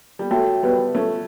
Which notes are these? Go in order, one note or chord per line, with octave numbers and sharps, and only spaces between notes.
G3
A3 F#4 C#5 E5 G5
G3 B3
A3 C#4